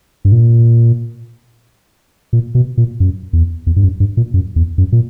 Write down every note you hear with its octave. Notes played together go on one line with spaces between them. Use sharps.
G2
A#2
A#2
B2
A#2
F#2
E2
E2
G2
F#2
G2
A#2
F#2
E2
F#2
A#2